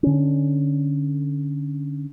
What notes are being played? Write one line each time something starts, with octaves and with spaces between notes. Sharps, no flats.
D3 C#4